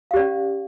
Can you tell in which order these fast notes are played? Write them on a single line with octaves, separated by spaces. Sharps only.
F5 G4 D5 C#4